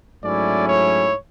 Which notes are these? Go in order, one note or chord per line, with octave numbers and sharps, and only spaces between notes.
G#2 F#3 A3 C#4 E4 D5
C#5